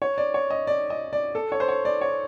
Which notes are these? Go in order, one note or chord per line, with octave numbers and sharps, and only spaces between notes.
C#5
D5
C#5
D#5
D5
D#5
D5
A4
C#5
C5
C#5
D5
C#5